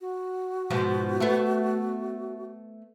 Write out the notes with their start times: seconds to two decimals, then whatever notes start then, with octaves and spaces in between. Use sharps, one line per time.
0.01 F#4
0.70 G#2 B2 F3
1.20 A3 B3